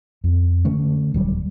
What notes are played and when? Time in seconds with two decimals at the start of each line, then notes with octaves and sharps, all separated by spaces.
0.24 F2
0.65 D3 A3 C#4
1.14 D#1 F#3 G3